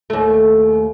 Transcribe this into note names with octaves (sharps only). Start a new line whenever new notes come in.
D#2 A3